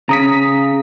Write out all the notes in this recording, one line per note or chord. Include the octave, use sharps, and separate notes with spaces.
C#3 A#5 D#6 B6